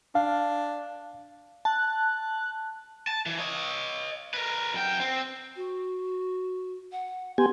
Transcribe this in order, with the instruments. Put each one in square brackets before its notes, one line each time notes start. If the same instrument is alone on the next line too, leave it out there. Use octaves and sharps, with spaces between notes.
[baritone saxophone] D4 [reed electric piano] F5
[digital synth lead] A5 [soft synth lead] F#6
[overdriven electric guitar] A5
E3
C#5 D#5
A#4 B4
F#2 G5
C4
[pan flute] F#4
F#5
[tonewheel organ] B3 G4 G#5 [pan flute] C6